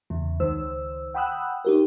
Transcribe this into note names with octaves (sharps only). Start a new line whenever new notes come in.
E2 C#3
C#2 D#3 C5 E6
F#5 G5 B5 D#6 E6 F#6
D#4 G4 A#4